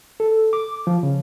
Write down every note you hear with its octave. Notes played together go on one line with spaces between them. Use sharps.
A4
D6
F3
C#3